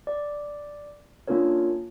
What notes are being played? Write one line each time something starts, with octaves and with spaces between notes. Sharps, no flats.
D5
A#3 C#4 D4 F4 A#4 C#5